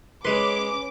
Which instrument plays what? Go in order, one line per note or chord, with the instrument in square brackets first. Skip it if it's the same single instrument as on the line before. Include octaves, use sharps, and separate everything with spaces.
[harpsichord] G#3 C6 [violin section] C#4 D6 [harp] B4